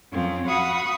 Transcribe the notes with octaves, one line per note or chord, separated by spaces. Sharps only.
F2 F3 C4 C#4
F#4 F5 F#5 B5 C#6 D#6